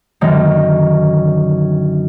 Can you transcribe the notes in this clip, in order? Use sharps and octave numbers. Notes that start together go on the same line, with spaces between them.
F#2 D3 D#3 A#3 D#4